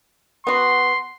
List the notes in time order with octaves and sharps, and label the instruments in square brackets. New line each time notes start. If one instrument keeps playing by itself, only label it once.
[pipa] B3 F#4 [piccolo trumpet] C6